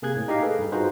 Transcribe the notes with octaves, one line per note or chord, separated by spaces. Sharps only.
C3 A#3 G#4 F#6 G#6
A2
D#4 G4 D#5 F5
G#4 A4 B4
G2
D#4 F4 F#4 G#4 B4 C5